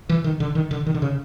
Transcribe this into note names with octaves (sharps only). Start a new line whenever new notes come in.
E3
D#3
D3
D#3
D3
D#3
D3
C#3